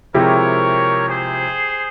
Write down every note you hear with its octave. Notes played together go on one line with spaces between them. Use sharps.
C3 F3 G#3 E4 G4 A#4 C#5
G#4 C5